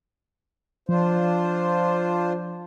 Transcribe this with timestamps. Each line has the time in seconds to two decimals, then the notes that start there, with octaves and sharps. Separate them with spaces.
0.89 F3 D4 F4 C5